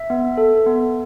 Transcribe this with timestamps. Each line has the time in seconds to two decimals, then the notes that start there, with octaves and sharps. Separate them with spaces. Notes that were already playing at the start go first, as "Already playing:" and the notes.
Already playing: E5
0.10 B3
0.38 A4
0.66 B3